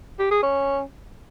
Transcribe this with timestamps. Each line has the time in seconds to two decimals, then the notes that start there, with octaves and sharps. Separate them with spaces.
0.19 G4
0.31 G#4
0.43 C#4